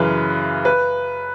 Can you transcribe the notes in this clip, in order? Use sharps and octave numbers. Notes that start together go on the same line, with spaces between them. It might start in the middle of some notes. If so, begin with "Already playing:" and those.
Already playing: F#2 C#3 E3 B4
B4